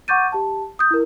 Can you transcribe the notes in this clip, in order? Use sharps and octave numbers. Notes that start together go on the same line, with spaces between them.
F#5 C#6 D6 G6 A6 D#7
G4 A5
D#6 G6
E4 A#4